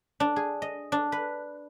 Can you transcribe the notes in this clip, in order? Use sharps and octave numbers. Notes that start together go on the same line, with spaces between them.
D4
G#4
D#5
D4
B4